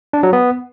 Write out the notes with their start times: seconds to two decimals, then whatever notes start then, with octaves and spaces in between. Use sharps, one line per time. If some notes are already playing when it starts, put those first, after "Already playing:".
0.13 D4
0.23 F#3
0.33 B3